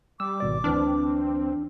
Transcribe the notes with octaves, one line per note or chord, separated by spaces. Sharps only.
G3 D6 E6
G#1 B2 D5
D2 E3 C4 D4 F6